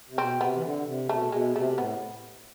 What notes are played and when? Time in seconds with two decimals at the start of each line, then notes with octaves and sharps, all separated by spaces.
0.09 C3
0.18 B2 C4
0.40 C3 B3
0.55 E3
0.63 D3
0.86 C3
1.09 B2 A3
1.32 B2 G#3
1.56 C3 A3
1.78 A2 B3